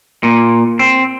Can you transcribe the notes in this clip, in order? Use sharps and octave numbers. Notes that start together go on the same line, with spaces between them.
A#2
C4